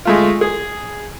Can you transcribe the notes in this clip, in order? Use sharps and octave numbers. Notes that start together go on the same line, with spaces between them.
G#3 A3 F4
G#4